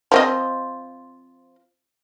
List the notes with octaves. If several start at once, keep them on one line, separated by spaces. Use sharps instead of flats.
F3 C4 D#5